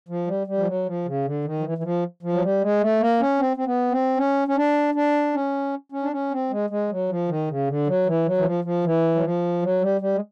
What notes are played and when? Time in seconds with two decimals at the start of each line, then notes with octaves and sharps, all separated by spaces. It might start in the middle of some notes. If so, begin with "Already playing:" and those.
0.09 F3
0.27 G3
0.47 G3
0.58 F3
0.67 F#3
0.86 F3
1.06 C#3
1.25 D3
1.45 D#3
1.59 F3
1.64 E3
1.78 E3
1.83 F3
2.23 F3
2.33 F#3
2.42 G3
2.61 G#3
2.81 A3
3.00 A#3
3.20 C#4
3.39 C4
3.57 C4
3.65 B3
3.91 C4
4.17 C#4
4.48 C#4
4.56 D4
4.94 D4
5.34 C#4
5.92 C#4
6.03 D4
6.12 C#4
6.31 C4
6.51 G#3
6.70 G#3
6.90 F#3
7.09 F3
7.28 D#3
7.48 C#3
7.68 D3
7.87 F#3
8.06 E3
8.26 F#3
8.38 E3
8.45 F3
8.64 F3
8.84 E3
9.15 F#3
9.23 F3
9.62 F#3
9.81 G3
10.01 G3
10.15 G#3